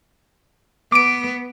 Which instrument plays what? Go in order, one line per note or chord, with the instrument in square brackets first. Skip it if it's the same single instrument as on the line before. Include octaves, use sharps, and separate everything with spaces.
[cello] B3 [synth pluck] D6 D7